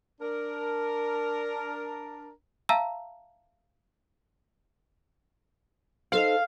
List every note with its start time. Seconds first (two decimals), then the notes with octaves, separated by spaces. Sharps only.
0.21 D4 A#4
2.69 E5 F5 A5 A#5 E6
6.12 D#4 A4 C5 F5